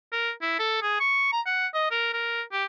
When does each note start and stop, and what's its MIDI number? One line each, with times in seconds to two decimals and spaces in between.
0.12 0.31 70
0.42 0.54 64
0.59 0.79 69
0.82 0.95 68
1.00 1.29 85
1.33 1.41 82
1.46 1.67 78
1.74 1.89 75
1.91 2.12 70
2.13 2.42 70
2.52 2.65 67